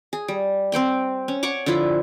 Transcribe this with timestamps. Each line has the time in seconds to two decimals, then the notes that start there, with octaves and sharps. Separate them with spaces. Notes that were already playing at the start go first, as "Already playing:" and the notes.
0.13 G#4
0.28 G3
0.72 C4 C5 G5 C6
1.28 C#4
1.43 C#5 F#5 C#6 D6
1.66 D3 F3 E4 F4